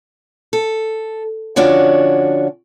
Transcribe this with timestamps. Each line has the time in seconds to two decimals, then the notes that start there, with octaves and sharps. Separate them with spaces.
0.53 A4
1.56 D3 F3 C#4 D4 F#4 C#5